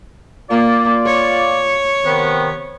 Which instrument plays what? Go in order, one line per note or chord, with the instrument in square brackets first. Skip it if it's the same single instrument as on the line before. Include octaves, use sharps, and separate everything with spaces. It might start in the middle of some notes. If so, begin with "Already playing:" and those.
[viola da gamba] A#3 [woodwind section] F4 D5
[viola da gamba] C#5
[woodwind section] C3 D#3 B3